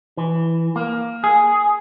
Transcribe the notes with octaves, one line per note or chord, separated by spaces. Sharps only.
E3
A#3
G#4